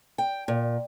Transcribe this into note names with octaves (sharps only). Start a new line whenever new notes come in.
G5
A#2